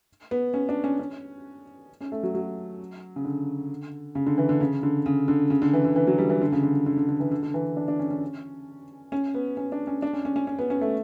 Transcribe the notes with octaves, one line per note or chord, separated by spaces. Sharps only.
B3
C#4
D4
C#4
C#4
C#4
A3
F#3
F#3
C#3
D3
C#3
D3
E3
D3
C#3
D3
C#3
D3
C#3
D3
E3
D3
E3
F#3
G3
E3
D3
C#3
D3
D3
D3
D3
E3
D3
D3
E3
D4
D4
C#4
C#4
C#4
B3
C#4
D4
C#4
D4
C#4
C#4
C#4
C#4
B3
C#4
A3